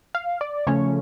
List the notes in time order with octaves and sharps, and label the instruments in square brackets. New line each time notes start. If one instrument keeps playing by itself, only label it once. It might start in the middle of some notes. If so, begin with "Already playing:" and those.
[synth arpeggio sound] F5
D5
C#3 F3 A3 C#4 C#5